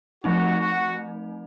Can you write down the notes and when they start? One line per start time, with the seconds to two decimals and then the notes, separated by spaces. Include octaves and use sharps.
0.24 F3 A3 C4 D#4 F#4
0.59 F#4